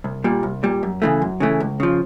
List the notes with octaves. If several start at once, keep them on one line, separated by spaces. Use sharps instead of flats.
C2
A#2 G3
C2
A#2 G3
F#2
C#3 E3 A3
F#2
C#3 E3 A3
C#2
C#3 F3